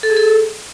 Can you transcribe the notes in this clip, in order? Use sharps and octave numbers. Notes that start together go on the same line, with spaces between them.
A4
G#4
A4